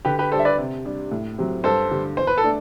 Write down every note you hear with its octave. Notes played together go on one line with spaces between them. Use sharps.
D3 G4 B4
G4 B4
G3 D4 G4 A4 C5
E5
B4 D5
C3
G3 D4
A2
F#3 C4 G4
G2 A4 C5
D3 G3
E2 C5
B4
A4
A3 D4